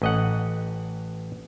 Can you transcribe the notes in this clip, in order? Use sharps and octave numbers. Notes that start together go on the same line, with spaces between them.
A1 D#5 F#5